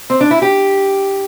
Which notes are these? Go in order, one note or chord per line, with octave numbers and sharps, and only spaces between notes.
C4
D4
E4
G4